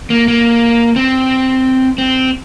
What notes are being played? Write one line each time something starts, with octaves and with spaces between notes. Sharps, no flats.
A#3
A#3
C4
C4